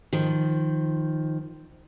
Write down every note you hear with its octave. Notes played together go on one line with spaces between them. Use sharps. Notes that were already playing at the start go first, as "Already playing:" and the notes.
D#3 F3